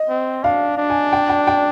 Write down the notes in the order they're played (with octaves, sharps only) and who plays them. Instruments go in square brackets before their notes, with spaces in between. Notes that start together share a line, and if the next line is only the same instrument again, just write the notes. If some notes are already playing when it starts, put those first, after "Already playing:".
Already playing: [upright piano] D#5
[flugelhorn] C4
[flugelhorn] D4 [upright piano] F5
[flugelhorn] D4
[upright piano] G#5
G5
G5
G5